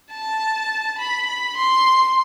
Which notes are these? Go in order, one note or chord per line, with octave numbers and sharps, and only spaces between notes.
A5
B5
B5
C6